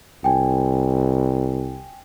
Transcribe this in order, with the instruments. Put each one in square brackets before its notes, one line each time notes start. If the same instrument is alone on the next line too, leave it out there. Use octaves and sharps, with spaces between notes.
[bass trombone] C2 [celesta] G5 G#5